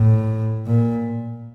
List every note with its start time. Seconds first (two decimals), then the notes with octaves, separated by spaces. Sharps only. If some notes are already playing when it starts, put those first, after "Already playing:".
Already playing: A2
0.66 A#2